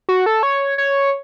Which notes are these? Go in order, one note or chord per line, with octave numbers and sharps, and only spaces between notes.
F#4
A4
C#5
C#5